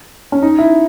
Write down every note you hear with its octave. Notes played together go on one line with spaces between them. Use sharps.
C#4
D#4
E4